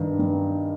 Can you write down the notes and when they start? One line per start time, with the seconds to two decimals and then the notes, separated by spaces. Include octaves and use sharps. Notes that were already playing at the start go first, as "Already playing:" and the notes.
Already playing: G2 D#3
0.19 G2